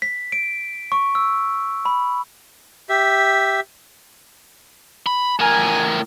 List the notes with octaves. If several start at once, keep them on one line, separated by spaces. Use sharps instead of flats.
B6
D7
C#6
E6
B5
G4 E5
B5
A2 A#4 G#5